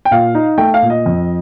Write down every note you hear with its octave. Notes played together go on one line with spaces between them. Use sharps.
G5
A#2 F5
D#4
A3 G5
F5
A#2
D#5
F2